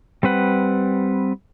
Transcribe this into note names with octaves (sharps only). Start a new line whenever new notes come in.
G3 C4 B4 F#5